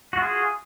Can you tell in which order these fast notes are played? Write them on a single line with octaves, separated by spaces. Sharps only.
F#4 F4 G#4